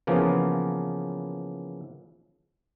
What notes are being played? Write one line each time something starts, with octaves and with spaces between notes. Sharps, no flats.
C#3 E3 F3 A#3 B3